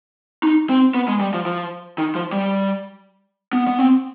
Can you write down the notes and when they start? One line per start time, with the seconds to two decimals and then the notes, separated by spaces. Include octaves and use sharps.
0.43 D#4
0.69 C4
0.95 B3
1.08 G#3
1.21 G3
1.34 F3
1.46 F3
1.98 D#3
2.15 F3
2.33 G3
3.53 B3
3.68 B3
3.79 C4